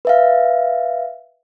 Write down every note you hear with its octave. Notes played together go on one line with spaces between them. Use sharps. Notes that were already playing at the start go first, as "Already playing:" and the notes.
B4 E5 F5